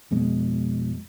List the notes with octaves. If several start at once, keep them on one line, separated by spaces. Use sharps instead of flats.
F2 B2 G#3